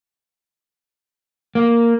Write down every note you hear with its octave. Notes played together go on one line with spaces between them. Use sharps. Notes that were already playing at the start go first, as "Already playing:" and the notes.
A#3